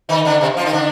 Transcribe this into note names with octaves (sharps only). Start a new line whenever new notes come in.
D#3 D#4
D3 D4
C3 C4
F3 F4
D#3 D#4
D3 D4